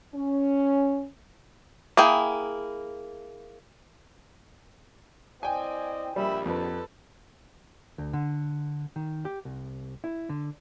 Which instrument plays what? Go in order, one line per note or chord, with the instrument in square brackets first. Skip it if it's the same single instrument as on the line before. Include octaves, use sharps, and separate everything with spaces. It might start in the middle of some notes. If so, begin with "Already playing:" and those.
[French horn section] C#4
[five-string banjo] A#3 E4 G#4 G5
[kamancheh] C4 [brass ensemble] E4 D5 D#5 [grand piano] G5 G#5
[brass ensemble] A#1 D#2 [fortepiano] G3 [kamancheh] E5 B5
[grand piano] F2 [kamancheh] A4 B4
[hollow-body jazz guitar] D2
D3
D#3
G4
C2
E4
D3